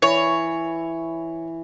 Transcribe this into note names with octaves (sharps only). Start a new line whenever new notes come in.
E3 C#5